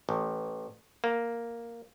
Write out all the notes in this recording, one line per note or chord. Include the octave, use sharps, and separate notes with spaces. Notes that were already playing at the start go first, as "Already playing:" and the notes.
A1
A#3